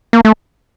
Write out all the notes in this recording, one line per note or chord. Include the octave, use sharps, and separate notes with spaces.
A#3
A3